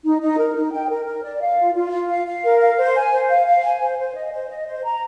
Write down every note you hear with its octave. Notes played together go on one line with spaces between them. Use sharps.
D#4
D#4
A#4
D#4
G5
A#4
A#4
D5
F5
F4
F4
F4
F5
F5
A#4
F5
C5
G#5
C5
F5
F5
G#5
C5
C5
D#5
C5
D#5
C5
A#5